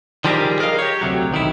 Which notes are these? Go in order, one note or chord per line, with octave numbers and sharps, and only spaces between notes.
D#3 F3 G3 G4 G#4 A#4
G#4 A#4 D5 D#5 F5
G4 C#5
D2 C3 F#3
B1 D#3 E4